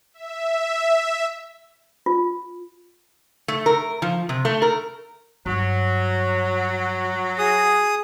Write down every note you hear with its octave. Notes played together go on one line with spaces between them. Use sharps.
E5
F4
A3
A#4
F3
C3
A3
A#4
G2 F#3
G#4 D#6